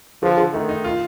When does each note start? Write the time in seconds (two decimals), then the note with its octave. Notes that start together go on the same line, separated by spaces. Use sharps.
0.23 D3 F3
0.37 D3
0.53 D#3 A3
0.69 D#4
0.84 F4